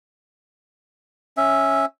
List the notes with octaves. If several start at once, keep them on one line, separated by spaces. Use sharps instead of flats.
C#4 E5